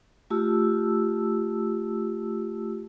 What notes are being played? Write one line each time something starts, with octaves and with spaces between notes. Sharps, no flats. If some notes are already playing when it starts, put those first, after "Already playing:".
A3 F4 G4 A5 E6